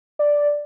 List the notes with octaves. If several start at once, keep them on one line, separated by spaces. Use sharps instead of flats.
D5